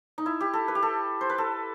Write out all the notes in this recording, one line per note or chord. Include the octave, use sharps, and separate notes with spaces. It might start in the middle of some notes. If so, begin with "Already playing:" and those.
D#4
E4
G4
A4
B4
G4
A4
C5
B4
A4